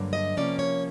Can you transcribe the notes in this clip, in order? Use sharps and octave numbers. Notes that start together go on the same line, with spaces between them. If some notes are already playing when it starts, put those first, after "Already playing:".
Already playing: G2 D3 F#3 A#3
D#5
C3 F3 A#3 C#4 D5
C#5